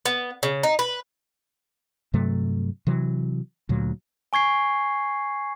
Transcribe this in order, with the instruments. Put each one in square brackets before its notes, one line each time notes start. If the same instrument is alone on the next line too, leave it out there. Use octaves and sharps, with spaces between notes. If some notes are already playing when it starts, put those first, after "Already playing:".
[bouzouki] B3
C#3
D#4
B4
[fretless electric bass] G2 C3 F#3 A3
C3 E3 F#3
D2 A#2 F#3
[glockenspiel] G#5 C#6 G#6 C7